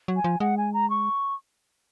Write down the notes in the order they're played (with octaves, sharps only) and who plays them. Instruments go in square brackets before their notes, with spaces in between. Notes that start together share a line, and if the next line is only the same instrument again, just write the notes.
[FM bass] F#3
[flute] G#5
[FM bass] F3
[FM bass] G#3 [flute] F#5
[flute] G#5
A#5
C#6